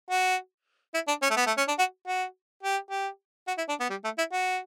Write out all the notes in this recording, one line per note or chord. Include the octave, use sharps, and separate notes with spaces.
F#4
E4
D4
C#4
A3
B3
A3
C#4
D4
F#4
F#4
G4
G4
F#4
E4
D4
B3
G3
A3
E4
F#4